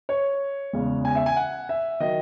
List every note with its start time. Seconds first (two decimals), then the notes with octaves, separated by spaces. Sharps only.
0.09 C#5
0.73 E2 C#3 G#3
1.05 G#5
1.15 E5
1.26 G#5
1.36 F#5
1.69 E5
2.00 D#3 F#3 D#5